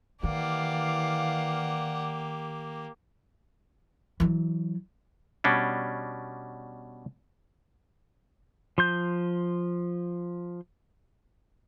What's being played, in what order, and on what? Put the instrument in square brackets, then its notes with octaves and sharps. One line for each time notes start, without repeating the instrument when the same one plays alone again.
[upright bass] D#3 [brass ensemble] E3 F5 [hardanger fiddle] A#3 G4 [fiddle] D5 F#5
[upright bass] E3 F#3
[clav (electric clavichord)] B2 G3 C#4 D4
[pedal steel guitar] F3 C6 G6